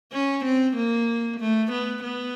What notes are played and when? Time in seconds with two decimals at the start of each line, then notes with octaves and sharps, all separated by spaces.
0.13 C#4
0.45 C4
0.77 A#3
1.40 A3
1.72 B3
2.04 B3